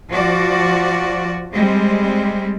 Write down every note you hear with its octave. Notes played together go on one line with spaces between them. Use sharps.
F3 F#4 D5
G3 G#3 C4